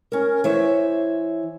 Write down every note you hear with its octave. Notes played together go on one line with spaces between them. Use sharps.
C#4 A#4
E3 C5 C#5 E5